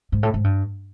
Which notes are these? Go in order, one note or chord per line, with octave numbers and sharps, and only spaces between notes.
G#2
A2
G#2
G2